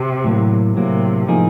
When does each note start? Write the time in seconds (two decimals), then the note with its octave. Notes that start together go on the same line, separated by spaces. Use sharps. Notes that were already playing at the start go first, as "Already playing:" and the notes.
Already playing: C3
0.24 A2 F#3 A#3
0.76 A2 C3 F#3 A#3
1.28 A2 F3 A#3 D#4 G#4